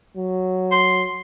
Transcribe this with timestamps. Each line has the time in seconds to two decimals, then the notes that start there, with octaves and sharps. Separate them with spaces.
0.16 F#3
0.72 C6